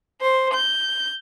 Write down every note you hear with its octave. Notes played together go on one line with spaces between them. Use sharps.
C5
G6